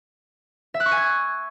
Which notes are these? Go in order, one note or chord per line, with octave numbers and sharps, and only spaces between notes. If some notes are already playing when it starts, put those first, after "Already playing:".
E5
F#6
C#6
G#5
G#6